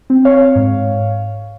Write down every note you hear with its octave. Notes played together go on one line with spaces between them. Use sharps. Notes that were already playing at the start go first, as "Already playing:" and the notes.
C4
C#5 F5
G#2